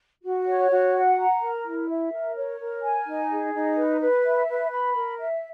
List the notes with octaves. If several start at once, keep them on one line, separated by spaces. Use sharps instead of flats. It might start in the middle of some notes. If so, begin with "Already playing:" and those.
F#4
C#5
F#4
F#5
A#5
A#4
E4
E5
A#4
C#5
A#4
G#5
D#4
G#4
D#4
B4
B4
E5
B4
B5
A#4
E5